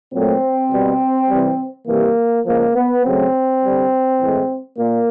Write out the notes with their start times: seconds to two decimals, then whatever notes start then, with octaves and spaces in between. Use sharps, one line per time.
0.13 A#2 F#3 A3 C4
0.72 B2 G3
1.29 C3 E3 G3
1.87 C3 E3 G3 A#3
2.46 C#3 F3 G#3 A#3
2.75 B3
3.04 C#3 F#3 A3 C4
3.62 D3 G3
4.21 A2 E3 G#3
4.78 A#2 A#3